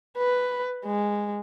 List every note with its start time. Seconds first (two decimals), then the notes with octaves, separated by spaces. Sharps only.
0.18 B4
0.85 G#3